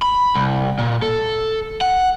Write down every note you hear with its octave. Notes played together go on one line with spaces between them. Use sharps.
B5
C2
A#2
A4
F#5